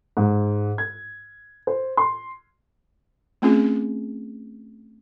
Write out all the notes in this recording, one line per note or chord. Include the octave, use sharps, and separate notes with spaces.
G#2
G#6
C5
C6
A3 C4 C#4 F4 G#4